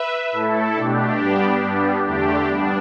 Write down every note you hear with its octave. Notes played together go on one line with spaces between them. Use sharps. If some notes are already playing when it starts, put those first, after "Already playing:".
Already playing: B4 E5
A2 A3 E4 A4
B2 A3 D4 G4
G2 G3 B3
G2 G3 B3
E2 D3 A3 D4 G4
G2 G3 B3 D4